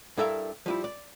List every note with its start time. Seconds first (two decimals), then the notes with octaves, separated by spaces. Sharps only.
0.18 G2 E4 A4 A#4 E5 F5
0.66 F3 G3 E4
0.84 D5